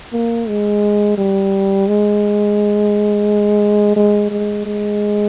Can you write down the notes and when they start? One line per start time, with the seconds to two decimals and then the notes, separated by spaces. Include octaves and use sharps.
0.13 A#3
0.48 G#3
1.18 G3
1.88 G#3
3.96 G#3
4.31 G#3
4.66 G#3